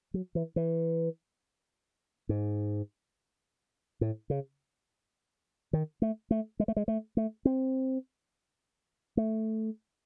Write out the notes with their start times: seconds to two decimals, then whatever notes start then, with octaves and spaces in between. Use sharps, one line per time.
0.14 F#3
0.35 E3
0.56 E3
2.29 G#2
4.01 A2
4.30 C#3
5.73 D#3
6.02 A3
6.31 A3
6.60 G#3
6.68 A3
6.77 G#3
6.88 A3
7.17 A3
7.45 C4
9.17 A3